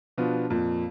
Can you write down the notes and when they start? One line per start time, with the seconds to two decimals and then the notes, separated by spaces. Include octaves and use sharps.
0.18 B2 F3 B3 D4 F4
0.50 F2 A#2